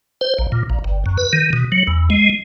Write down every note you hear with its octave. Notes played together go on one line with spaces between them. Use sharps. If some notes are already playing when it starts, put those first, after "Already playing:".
C5
A#1
A#2
A#1
G1
F#2
B4
D#3
B2
F#3
E2
G#3